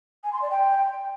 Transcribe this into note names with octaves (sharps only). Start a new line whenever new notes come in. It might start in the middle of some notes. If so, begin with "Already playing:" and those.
G#5
C6
D5
G5